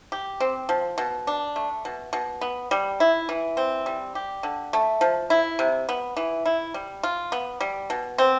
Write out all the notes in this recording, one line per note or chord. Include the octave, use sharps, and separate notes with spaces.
G4
C4
F3
B2
D4
A3
B2
B2
B3
G3
E4
E3
C4
G3
G4
D3
A3
F3
E4
C3
B3
E3
E4
G3
F4
B3
G3
B2
C4